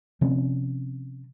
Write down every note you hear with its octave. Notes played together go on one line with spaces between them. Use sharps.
C3 F3 C4 C#4